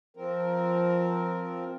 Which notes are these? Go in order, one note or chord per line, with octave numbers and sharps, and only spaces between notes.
F3 C4 A#4